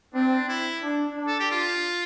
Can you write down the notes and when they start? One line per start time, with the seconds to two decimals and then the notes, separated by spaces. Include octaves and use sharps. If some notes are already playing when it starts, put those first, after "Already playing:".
0.14 C4 D4
0.49 E4
0.83 D4
1.17 D4
1.27 A4
1.40 G4
1.51 F4